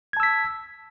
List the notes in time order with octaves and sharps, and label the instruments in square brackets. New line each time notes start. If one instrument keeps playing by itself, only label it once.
[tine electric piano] G#6
A5
E6
B6